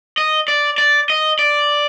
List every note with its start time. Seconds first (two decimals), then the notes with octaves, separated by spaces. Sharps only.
0.18 D#5
0.48 D5
0.78 D5
1.10 D#5
1.39 D5